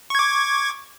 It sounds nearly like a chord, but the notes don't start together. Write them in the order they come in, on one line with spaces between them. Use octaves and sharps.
C#6 G#6 D6